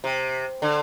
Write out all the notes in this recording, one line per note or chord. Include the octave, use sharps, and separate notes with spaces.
C3
D3